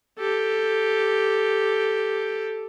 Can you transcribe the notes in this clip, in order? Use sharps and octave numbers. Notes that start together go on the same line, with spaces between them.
G4 A4